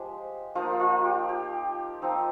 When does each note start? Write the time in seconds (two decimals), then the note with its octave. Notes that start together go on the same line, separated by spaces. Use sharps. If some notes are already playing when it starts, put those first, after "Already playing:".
Already playing: F3 G#3 G4 C5
0.55 F3 A#3 D#4 F4
0.80 F4
1.04 G4
1.29 G4
2.02 F3 C4 D#4